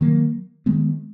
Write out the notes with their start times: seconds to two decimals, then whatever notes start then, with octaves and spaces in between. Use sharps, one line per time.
0.01 D#3 F#3 A#3
0.66 D#3 G#3 B3